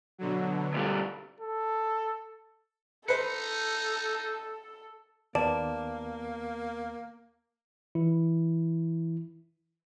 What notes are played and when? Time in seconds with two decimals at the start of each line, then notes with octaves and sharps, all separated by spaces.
0.18 B2 D3 F#3
0.74 D2 G3
1.40 A4
3.08 D#4 A4 B4 C5 C#7
5.35 D#2 A#3 B3 D5 A5
7.95 E3 E4